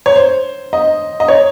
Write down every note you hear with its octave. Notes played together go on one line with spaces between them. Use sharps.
C#5
C5
D#5
D#5
C#5